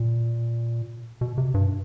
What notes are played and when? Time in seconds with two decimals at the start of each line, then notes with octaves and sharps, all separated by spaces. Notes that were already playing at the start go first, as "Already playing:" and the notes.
Already playing: A#2
1.21 B2
1.38 C3
1.54 G2